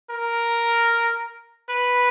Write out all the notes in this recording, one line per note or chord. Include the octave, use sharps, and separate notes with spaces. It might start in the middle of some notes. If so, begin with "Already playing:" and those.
A#4
B4